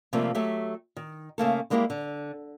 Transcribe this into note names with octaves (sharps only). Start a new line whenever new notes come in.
C3 F3 G3 A3 A#3 C4
F#3 A3 G4 E5
D#3
C#3 A3 A#3 A4
G3 G#3 A#3 E4 F#4 G4
D3